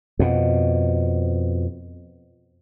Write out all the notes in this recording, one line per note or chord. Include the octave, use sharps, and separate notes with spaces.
F2 B2